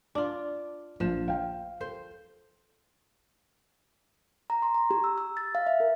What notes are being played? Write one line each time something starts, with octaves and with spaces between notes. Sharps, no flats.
D4 F4 D6
A#1 F3 E7
F5 G5
A4 C5
A#5
C6
A#5
G4
E6
E6
A6
F5
E5
A#4